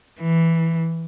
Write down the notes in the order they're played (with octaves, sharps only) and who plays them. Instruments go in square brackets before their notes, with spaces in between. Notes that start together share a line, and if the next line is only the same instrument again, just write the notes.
[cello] E3